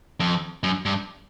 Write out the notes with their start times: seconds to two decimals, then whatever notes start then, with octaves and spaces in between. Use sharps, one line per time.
0.20 F2
0.63 F#2
0.86 G2